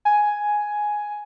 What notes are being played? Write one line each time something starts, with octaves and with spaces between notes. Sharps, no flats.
G#5